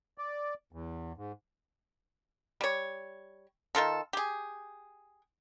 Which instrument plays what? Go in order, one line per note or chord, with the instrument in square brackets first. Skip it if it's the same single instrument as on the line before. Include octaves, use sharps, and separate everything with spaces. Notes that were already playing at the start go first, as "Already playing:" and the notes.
[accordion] D5
E2
G#2
[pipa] G3 C#5
D#3 F#3 F4 A4
G4 G#4